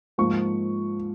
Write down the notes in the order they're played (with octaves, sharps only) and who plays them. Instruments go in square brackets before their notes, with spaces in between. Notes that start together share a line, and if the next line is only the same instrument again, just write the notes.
[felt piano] G#2 F3 A#3 C#6